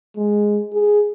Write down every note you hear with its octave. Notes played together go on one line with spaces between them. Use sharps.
G#3
G#4